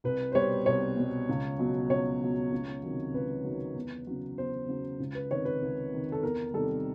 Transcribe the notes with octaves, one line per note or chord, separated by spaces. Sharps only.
C2 B4
C5
B2 G3 C#5
C2 C#5
B2 G3
C#2
B2 F#3
C#2 C#5
B2 F#3
C#2
C3 D#3 F#3
C#2 B4
C3 D#3 F#3
E2
C#3 F#3
E2 C5
C#3 F#3
C#2
B4
C3 D#3 C#5
B4
C#2
C3 D#3
A4
E2 A#4
C3 D#3 G3 A4